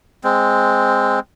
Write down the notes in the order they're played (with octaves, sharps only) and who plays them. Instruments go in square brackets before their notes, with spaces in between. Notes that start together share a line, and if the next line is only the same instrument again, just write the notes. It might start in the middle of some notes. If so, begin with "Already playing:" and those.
[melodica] G#3 C4